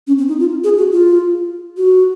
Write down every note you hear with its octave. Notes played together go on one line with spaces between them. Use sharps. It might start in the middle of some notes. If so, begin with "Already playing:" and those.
C#4
C4
D#4
F4
G#4
F#4
F4
F#4